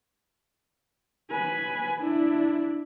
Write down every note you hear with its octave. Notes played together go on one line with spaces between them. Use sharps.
B4 G#5
D4 E4